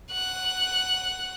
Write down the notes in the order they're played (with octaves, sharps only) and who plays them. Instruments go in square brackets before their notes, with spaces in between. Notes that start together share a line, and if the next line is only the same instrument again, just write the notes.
[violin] F#5 F#6